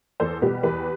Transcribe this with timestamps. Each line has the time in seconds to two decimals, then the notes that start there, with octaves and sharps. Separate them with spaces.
0.20 E2 A4 C5
0.42 B2 G3 G4 B4
0.63 E2 G4 B4